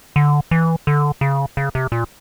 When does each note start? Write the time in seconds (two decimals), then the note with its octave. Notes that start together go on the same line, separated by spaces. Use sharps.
0.16 D3
0.51 E3
0.87 D3
1.21 C#3
1.57 C#3
1.75 C3
1.92 A#2